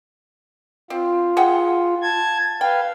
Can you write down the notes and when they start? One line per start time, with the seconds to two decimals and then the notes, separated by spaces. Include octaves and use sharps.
0.90 C4 F4
1.37 G#4 F#5 G5
2.02 A5 G#6
2.61 B4 F5 G5